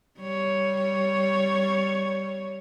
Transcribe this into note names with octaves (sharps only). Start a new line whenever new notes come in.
G3 C#5